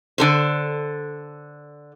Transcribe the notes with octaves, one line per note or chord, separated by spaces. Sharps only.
D3 A4 C5